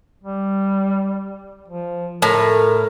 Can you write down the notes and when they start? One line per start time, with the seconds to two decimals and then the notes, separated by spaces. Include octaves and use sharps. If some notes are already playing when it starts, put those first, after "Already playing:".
0.23 G3
1.68 F3
2.22 A2 A#4